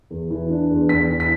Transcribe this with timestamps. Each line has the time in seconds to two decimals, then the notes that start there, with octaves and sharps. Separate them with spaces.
0.10 E2
0.30 E3
0.50 D4
0.71 E2
0.89 E2 B6
1.10 E3
1.20 B6